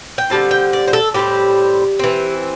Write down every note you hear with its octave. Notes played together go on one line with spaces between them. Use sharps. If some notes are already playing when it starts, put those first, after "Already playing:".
G5
D3 G3 C4 A5
G5
D5
C5
A4
A2 G3 C4 G4
E3 C4